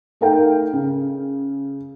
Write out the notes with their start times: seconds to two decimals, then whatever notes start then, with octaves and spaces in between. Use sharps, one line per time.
0.21 A3 D#4 A#4 F5 G5
0.73 C#3